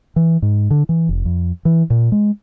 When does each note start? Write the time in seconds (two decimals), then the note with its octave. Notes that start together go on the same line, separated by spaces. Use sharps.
0.16 E3
0.42 G#2
0.70 D3
0.89 E3
1.09 F1
1.25 F2
1.65 E3
1.90 A#2
2.12 G#3